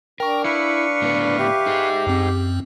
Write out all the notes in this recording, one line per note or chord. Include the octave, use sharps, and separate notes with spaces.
D4 A#4 G5 C#6
E4 B4 F5 C#6 C#7
A2 D3 B3
G4 E5
D#4 G#4
F#2 C4